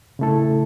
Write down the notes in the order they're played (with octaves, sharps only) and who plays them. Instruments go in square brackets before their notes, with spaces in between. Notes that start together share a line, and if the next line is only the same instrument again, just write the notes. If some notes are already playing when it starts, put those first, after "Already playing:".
[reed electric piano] C#3 A3 E4 A4